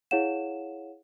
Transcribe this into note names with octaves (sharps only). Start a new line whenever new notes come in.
E4 G#4 C#5 F5 F#5 E7